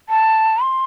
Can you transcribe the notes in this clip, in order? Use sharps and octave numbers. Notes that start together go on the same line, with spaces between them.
A5
C6